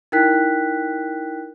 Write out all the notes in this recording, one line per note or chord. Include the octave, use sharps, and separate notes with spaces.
D#4 E4 A#4 G5 F#6 B6